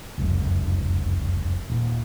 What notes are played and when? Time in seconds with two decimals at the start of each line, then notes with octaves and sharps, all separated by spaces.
0.18 F1 C#2 F#2
1.70 D#1